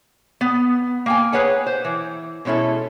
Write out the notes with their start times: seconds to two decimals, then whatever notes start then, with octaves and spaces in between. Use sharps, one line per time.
0.41 B3
1.06 A#3 G5 G#5
1.33 G#4 B4 C#5 F#5 G#5
1.66 C5
1.85 E3
2.45 B2 G#3 C#4 E4 A4